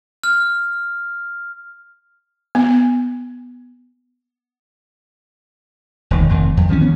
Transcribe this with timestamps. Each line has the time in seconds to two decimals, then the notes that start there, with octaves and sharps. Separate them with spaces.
0.24 F6
2.55 B3
6.11 E1 D#2 D#3
6.29 F1 F2 D#3
6.57 F2
6.69 D#3 F3 A#3 C#4
6.80 E3 B3 C#4